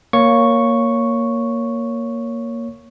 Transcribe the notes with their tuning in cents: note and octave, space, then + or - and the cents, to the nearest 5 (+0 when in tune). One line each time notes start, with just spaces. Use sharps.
A#3 +0 C#5 +5 C#6 +0